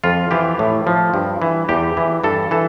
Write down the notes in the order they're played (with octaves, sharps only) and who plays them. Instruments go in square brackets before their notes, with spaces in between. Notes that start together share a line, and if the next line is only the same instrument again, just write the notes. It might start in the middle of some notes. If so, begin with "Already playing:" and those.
[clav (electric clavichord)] F2 F4
E3 G4
A2
F3
G2
E3
E2 G4
E3
G2 A4
E3 A4